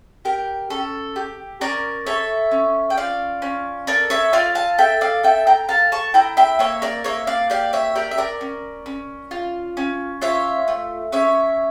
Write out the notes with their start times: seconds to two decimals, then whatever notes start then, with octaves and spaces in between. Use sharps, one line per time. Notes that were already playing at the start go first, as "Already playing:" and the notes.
0.25 G4 A#4
0.70 C#4 A4
1.16 G4
1.61 C#4 A#4 D5
2.06 A4 C#5 E5
2.51 C#4
2.90 G5
2.97 F4 D5 F5
3.42 C#4
3.87 A4 A#4 D5
4.10 C#5 E5
4.33 F4 D5 F5
4.55 F5 A5
4.78 A4 E5 G5
5.01 D5 F5
5.23 A4 E5 G5
5.47 G5 A#5
5.69 A4 F5 A5
5.92 A5 C#6
6.14 E4 G5 A#5
6.37 E5 G5
6.59 A#3 C#5 E5
6.82 A#4 D5
7.04 A#3 C#5 E5
7.27 D5 F5
7.50 G4 D5 F5
7.73 C#5 E5
7.95 G4 A#4 D5
8.11 E5
8.18 A#4 D5
8.41 C#4
8.86 C#4
9.31 F4
9.77 C#4
10.22 F4 C#5 E5
10.68 A3
11.12 C#4 C#5 E5